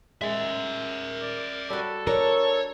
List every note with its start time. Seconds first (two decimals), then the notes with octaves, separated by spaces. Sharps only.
0.22 G#3 A#4 E5
1.22 D5
1.70 G3 F#4 A4
2.07 D4 A#4 C#5